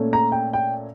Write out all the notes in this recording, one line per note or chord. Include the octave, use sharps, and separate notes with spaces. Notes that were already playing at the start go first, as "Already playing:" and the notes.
Already playing: A#2 A3 C#4
A#5
G5
G5